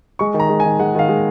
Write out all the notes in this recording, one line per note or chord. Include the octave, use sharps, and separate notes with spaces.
G#3 C#6
D#3
A#5
G#3
G#5
D#3
G#3 F#5
D#3 F5
G#3